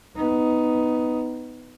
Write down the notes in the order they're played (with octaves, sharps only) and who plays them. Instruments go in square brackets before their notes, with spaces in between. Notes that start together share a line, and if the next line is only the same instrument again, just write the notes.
[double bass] B3 D#4